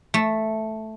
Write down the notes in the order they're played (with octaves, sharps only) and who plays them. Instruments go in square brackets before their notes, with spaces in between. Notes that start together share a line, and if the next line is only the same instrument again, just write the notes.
[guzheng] A3